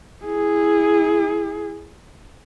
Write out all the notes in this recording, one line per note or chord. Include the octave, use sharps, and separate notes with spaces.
E4 G#4